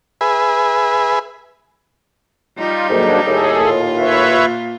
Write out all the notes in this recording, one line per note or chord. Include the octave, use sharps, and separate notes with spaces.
G#4 B4 E5
G3 D#4 F4
D2 G#2 D#3 F#3 A#3 D4
D#2 A2 G#4 A4
A#2 F4
B4 C#5 E5